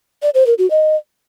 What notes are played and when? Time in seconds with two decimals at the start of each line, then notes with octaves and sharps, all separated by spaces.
0.22 D5
0.34 C5
0.46 A#4
0.58 F#4
0.70 D#5